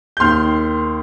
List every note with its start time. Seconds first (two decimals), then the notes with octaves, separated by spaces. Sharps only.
0.17 G6
0.20 D#2 D#3 C6 F6